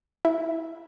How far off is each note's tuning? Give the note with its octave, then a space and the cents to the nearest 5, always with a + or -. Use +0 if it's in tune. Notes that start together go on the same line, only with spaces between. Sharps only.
E4 -10 E5 -10